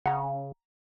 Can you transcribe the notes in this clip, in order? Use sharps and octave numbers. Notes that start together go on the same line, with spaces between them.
C#3 F#5 A#5